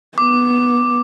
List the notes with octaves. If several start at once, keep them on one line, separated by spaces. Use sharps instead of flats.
B3 D6